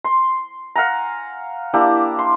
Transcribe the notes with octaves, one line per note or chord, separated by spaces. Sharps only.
C6
F5 F#5 G#5 A#5
A#3 D4 E4 G4
C6